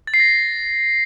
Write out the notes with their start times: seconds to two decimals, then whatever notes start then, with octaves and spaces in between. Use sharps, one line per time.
0.07 A6
0.14 C7
0.20 A#6